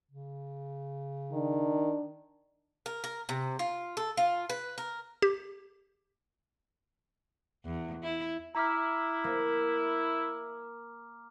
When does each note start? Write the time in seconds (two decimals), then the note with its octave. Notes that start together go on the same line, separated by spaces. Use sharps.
0.12 C#3
1.32 D#3 D4
2.86 A#4
3.04 A#4
3.29 C3
3.59 F4
3.97 A4
4.17 F4
4.50 B4
4.78 A#4
5.22 G4
7.65 E2
8.03 E4
8.55 E4 A#5 D6 F6
9.24 A#3